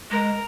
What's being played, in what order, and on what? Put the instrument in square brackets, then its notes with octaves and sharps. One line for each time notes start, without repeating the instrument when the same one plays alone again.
[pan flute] G#3 [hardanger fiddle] A#4